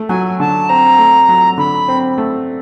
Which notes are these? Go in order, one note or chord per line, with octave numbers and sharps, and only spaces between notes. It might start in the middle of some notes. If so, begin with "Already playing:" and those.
Already playing: A3
F#3 G#5
D3 A5
C4 A#5
A3
F#3
D3 B5
C4
A3